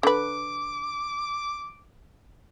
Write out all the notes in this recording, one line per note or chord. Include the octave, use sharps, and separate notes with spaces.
D3 B4 D6